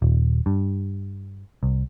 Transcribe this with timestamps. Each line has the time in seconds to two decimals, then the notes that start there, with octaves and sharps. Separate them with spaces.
0.02 D#1
0.46 G2
1.63 C2